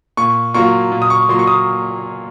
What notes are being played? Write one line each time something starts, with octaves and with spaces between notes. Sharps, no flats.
A#2 C#6
F#3 A#3 F4 C#6
A#2
D#6
C#6
F#3 A#3 F4 C6
C#6
D#6